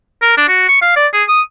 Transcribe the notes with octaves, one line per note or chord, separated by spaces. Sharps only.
A#4
D4
F#4
C#6
F5
D5
G#4
D#6